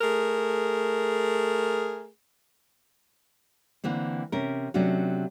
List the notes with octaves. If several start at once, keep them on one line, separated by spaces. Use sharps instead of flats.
A3 G#4 A#4
D3 E3 A#3 C4
C3 C#4 A#4
C3 F#3 A3 C#4 D4 F#4